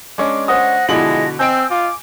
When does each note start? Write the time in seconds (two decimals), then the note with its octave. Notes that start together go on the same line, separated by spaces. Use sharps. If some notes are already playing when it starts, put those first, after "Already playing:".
0.18 G#3 C#4 D4 D6
0.48 C5 F#5 D#6 A#6
0.89 B2 D3 F3 G#3 E4 F#7
1.39 C4 D#5 G#5 E6 G6 D7
1.70 F4 D6